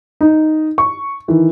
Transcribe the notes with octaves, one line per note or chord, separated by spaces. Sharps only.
D#4
C#6
D#3 E3